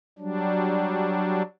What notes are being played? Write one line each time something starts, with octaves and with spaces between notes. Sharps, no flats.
F#3 G3 D4